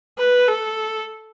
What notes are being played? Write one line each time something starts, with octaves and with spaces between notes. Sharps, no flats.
B4
A4